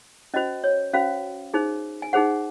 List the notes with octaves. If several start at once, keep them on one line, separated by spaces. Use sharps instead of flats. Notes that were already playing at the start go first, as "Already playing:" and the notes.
C#4 F#4 C5 D#5
C#5
C#4 F#4 C5 F5
D#4 G#4 C5
G#5
D#4 G#4 C5 F#5